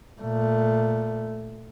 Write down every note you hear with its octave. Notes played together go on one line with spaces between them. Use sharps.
A#2 A3